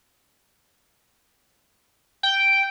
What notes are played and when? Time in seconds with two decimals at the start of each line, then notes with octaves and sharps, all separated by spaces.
2.23 G5